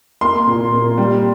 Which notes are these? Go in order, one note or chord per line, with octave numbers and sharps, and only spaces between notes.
A#3 C6
A#2
A#3
G3